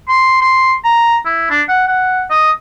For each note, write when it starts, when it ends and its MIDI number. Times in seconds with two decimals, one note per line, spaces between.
0.08 0.40 84
0.41 0.74 84
0.84 1.16 82
1.25 1.48 64
1.50 1.62 62
1.68 1.85 78
1.88 2.22 78
2.30 2.51 75